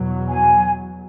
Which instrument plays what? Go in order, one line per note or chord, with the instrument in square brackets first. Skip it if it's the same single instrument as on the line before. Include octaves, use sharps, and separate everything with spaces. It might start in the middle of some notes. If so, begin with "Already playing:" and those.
Already playing: [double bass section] E2 B2 F#3
[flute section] G#5